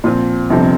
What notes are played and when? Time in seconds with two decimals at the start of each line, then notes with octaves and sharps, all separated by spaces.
0.04 A#2 F3 C4 F4
0.50 G1 F2 C3 F3 C4